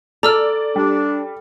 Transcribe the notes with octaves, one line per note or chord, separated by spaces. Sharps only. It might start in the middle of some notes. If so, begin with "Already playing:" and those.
A4 D5 A#5 E6 F6
G3 D4